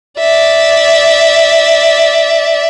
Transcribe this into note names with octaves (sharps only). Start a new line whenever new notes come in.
D5 E5